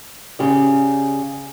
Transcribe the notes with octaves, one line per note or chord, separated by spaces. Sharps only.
C#3 G4 D5